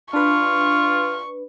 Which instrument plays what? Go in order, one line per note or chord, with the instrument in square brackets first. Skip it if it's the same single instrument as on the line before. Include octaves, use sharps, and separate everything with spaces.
[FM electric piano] D4 B4 [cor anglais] F4 [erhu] C#6